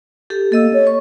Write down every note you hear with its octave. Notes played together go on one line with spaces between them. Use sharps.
G4 A4
A#3 A4 D#5 E6
C#5
C#6